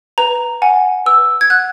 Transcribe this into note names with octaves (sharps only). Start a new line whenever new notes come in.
B4 A#5
F#5 G#5
B4 E6
G#6
F#5 F#6